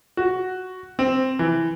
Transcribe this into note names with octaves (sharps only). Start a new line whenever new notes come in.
F#4
C4
E3